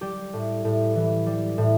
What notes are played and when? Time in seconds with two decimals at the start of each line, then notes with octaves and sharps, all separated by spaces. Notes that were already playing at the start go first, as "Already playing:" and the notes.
0.01 G3 G4
0.33 A2
0.64 A2
0.95 E3
1.26 G3
1.58 A2